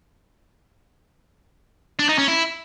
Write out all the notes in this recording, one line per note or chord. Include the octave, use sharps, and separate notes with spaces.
D4
D#4
C#4
E4